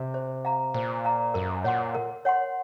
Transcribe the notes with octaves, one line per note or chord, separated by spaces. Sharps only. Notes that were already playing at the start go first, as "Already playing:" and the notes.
Already playing: C3
C5
F5 A#5
A#2 C5
F5 A#5
F#2 A#4
A#2 C#5 F#5 C6
A#4
C#5 F#5 C6